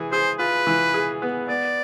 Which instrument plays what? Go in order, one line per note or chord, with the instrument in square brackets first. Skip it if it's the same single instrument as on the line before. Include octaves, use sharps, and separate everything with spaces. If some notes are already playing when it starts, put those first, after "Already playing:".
Already playing: [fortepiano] E3 G#4
[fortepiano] G#4 [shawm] C5
[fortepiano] F4 [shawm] B4
[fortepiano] E3
G#4
B3
[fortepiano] B3 [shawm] D5